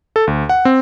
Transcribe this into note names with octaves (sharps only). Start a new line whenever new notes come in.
A4
D2
F#5
C4